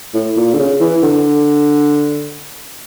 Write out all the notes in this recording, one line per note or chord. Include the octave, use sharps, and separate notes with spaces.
A2
A#2
D3
C#3
E3
D3